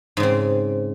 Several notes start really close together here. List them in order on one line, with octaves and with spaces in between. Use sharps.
G#2 C#3 C4